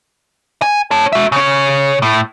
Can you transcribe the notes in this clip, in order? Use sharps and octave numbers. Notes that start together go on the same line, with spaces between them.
G#5
C#5 A5
F#4 E5
C#3 C#5
A2